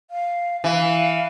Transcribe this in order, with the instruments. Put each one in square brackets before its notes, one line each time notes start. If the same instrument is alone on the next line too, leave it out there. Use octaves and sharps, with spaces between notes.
[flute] F5
[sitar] E3 [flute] F5